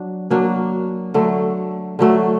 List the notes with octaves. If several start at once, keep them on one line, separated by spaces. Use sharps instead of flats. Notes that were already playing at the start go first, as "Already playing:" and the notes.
Already playing: F#3 D4
F#3 A#3 D4
D3 F#3 A3
D3 F#3 A3